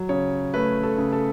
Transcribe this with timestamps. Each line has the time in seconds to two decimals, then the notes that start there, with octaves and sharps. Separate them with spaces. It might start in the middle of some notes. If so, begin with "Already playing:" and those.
Already playing: F#3
0.09 C#3 C#5
0.54 A3 B4
0.83 A4
0.98 C#3
1.12 A4